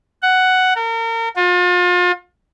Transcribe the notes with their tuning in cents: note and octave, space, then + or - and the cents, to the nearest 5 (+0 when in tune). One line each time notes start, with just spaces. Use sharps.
F#5 +5
A#4 -35
F4 +35